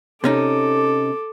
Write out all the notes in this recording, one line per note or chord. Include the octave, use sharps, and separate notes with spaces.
C3 C#4 D#4 A4 D6